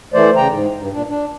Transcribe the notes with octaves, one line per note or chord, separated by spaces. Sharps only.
E3 A3 C5 D5
C#3 G5 A#5
G#2
G2
A#2 D4
D4